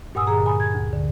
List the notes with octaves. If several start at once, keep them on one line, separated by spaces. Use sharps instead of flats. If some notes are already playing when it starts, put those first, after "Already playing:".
G2 A#2 F#5 G#5 D#6 E6
A#2 D3 G#4 A#5
G#5 B5 D#6
G#6
D2
D3